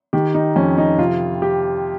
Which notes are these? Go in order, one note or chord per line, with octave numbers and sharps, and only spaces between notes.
D#3 G4
D#4
F2 C#4
D#4
C3 F4
G4